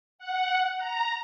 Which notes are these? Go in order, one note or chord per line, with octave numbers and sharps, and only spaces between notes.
F#5
A#5